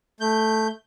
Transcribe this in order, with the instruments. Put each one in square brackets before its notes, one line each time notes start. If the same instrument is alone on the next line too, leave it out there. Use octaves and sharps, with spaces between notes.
[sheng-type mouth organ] A3 G6